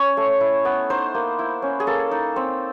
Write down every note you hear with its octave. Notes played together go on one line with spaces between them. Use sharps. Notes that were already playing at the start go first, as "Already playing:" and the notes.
Already playing: C#4 C#5
A3
E4
B3
D#4 C5
A#3
E4
C#4
G#4
A#3 A4
D#4
C4